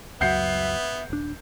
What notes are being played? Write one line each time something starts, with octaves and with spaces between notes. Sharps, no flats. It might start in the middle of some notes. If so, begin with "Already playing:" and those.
C#2 F#2 F#3 B3 E5 F#5 G6 C7
D#1 D4